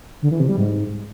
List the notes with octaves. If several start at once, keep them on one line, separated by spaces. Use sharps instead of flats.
D3
E3
C3
G3
G#2